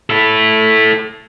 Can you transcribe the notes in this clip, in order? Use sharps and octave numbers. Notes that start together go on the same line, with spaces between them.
E4 A4